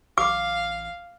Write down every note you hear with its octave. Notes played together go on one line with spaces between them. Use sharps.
A1 F5 D6